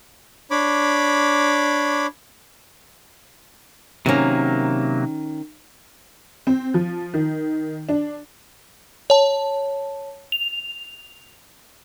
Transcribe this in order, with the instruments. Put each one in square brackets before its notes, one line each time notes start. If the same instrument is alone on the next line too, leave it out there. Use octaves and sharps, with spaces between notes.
[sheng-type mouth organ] D4 C#5 B5 D6
[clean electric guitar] C3 F#3 A#3 [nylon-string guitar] D#3 C#4
[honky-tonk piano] C4
F3
D#3
D4
[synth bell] C#5 A5
F7